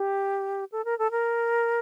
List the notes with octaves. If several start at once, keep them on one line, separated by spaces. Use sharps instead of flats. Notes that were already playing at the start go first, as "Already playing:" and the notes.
Already playing: G4
A4
A#4
A4
A#4